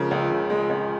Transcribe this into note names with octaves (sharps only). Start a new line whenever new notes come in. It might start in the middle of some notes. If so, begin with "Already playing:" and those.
Already playing: C#3 F3 G#3 A#4 A#5
C#2
C#3
G#3
C#2